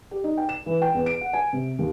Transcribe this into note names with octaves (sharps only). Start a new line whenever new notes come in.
G4
D#4
G5
E7
E3
G5
E2
D7
F#5
G#5
C3
D#2